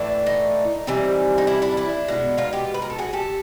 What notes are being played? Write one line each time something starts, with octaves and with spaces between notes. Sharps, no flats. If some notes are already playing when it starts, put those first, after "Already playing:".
Already playing: A2 E3 A3 D4
D#4
E3 G3 C4
D#4
D4 E4
D4 E4
D4 E4
B2 G#3 B3
D#4 F4
F4 G4
B4
A#4
A4
F#4 G#4
G4 A4